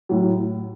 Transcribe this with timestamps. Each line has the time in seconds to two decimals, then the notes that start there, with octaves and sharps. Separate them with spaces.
0.09 A2 F#3